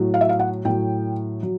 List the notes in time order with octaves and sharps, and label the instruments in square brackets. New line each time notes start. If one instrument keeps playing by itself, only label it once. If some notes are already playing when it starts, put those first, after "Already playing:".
Already playing: [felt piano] A2 F#3
F5
E5
F5
F#5
A2 F#3 G5
F#3